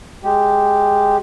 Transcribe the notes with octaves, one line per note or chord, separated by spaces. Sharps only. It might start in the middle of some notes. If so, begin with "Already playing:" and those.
G#3 G4